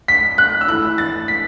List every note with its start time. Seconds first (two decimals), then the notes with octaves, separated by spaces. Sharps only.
0.08 B6
0.38 F#6
0.61 E6
0.68 E3 A3 E4 F#6
0.98 A6
1.28 B6